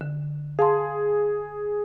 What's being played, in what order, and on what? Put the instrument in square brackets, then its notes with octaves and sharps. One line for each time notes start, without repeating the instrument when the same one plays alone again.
[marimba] D3
[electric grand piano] G#4 [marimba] F5 A5 C6